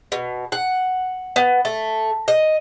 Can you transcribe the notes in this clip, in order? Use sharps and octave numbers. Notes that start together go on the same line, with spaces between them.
B2
F#5
B3
A3
D#5